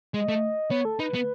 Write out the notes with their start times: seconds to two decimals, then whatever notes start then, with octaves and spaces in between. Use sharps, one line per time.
0.13 G#3 D#5
0.29 A3
0.71 B3 C#5
0.85 A4
0.99 D#4 B4
1.14 B3